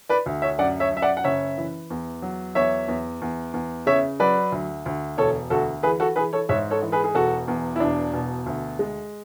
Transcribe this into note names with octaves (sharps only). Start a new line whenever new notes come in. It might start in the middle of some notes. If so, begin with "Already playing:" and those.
B4 D5
D2
C#5 E5
F#2 D5 F#5
C#5 E5
F#2 E5
D5 F#5
F#5
F#1 C#5 E5
E3
E2
F#3
E2 C#5 E5
E2
E2
E2
C#3 C#5 E5
F#3 B4 D5
D2
D2
E1 A4 C#5
D2 F#4 A4
E3 G#4 B4
F#4 A4
E3 G#4 B4
A4 C#5
G#2 C#5 E5
A4 C#5
E3
G#4 B4
G#4
E1 F#4 A4
E2
E4
E1 D4
B2
D2
G#3